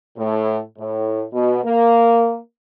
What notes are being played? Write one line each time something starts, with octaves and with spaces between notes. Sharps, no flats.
A2
A2
B2
A#3